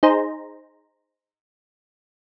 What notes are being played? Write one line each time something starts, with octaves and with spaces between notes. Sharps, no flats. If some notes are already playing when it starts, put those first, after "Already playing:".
D#4 G#4 C5 A#5